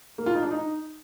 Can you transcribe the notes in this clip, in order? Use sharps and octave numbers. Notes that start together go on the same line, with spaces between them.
A#3
F4
D#4
D4
D#4